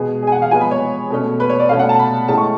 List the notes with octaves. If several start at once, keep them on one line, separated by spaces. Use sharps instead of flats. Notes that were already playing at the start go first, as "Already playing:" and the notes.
Already playing: B2 G#3 B3 G#4
G#4
G#5
F#5
F5
F3 G#3 B3 G#5
B5
C#5
B2 A3 C#4
B4
C#5
D5
B2 A3 C#4 F5
F#5
A5
B5
A2 G#3 C#4 A5
C#6